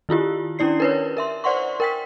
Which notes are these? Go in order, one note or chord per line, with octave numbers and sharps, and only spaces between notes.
D#3 E4 F4 G4
C#4 D4 E4 D5 C7
A#4 B4 C#5
A#4 E5 C6
C5 D5 F#5 C6 C#6
A#4 G5 B6